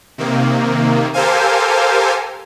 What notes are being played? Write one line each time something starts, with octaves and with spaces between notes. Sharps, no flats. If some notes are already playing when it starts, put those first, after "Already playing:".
C3 D#3 A#3
G4 A4 A#4 C5 F5 G#5